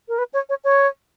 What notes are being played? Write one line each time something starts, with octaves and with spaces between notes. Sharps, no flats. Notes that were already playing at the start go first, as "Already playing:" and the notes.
A#4
B4
C#5
C#5
C#5